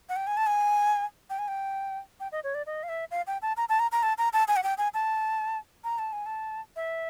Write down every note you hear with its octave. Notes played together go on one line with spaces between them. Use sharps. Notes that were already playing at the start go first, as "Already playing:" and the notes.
F#5
G5
G#5
A5
G#5
G5
G#5
G5
G5
D#5
C#5
D5
D#5
F5
E5
F5
G5
A5
A#5
A5
A#5
A#5
A5
A#5
A5
G#5
F#5
G5
G#5
A5
A#5
A5
G#5
A5
E5